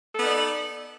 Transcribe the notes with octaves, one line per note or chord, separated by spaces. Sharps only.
B3 D#4 A4 D5